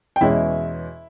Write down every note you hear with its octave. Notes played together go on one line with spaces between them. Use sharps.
G5
E2 B2 G#3 C#4 E4 E5